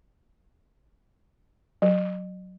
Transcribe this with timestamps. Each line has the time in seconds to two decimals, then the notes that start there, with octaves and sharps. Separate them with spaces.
1.82 F#3